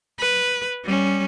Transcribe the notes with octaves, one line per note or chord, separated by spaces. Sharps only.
B4
G3 C#4